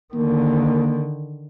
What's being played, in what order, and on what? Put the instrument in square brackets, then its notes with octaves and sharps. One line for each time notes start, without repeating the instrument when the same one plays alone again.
[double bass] D3 D#3 [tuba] A#3